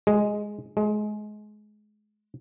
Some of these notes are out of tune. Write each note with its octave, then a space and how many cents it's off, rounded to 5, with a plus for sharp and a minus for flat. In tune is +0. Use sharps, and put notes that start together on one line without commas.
G#3 +0
G#3 +25